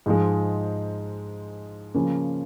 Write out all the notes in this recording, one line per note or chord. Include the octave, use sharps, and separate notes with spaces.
G#2 F3 G#3
C#3 F3 A#3 C#4